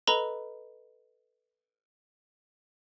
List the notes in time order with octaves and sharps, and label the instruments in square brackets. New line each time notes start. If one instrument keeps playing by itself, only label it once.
[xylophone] A4 B4 D#5 A#5 B5 G7